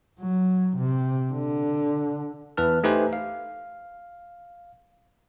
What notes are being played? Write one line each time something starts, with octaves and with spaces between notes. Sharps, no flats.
F#3
C3
D3
E2 E3 B4 A5 F6
A3 D#4 G4 B4 C5 G#5
F5